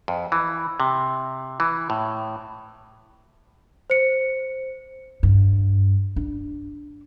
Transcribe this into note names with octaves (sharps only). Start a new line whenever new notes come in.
F2
E3
C3
E3
A2
C5 C#7
G2
D4